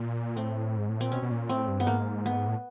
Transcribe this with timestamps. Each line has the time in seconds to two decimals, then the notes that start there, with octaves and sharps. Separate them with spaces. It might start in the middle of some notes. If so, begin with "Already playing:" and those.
Already playing: A#2
0.36 A2 C4
0.77 G#2
0.89 A2
1.00 A#2 C4
1.12 B2 C#4
1.22 B2
1.31 A#2
1.49 A2 C4
1.68 G2
1.80 B3
1.87 G#2 A#3
2.26 B3
2.47 A2